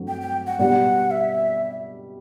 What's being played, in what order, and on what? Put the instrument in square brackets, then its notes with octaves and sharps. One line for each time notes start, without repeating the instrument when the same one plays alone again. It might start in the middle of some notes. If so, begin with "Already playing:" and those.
Already playing: [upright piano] G2 F#3 A3 C4
[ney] G5
G5
F#5
[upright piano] B2 G3 B3 D4 G4 [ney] F#5
[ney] E5